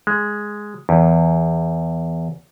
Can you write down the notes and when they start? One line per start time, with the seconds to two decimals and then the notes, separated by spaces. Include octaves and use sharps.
0.07 G#3
0.89 E2